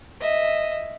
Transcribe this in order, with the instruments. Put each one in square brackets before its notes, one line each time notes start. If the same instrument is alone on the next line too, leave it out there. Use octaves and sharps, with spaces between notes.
[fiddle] D#5 E5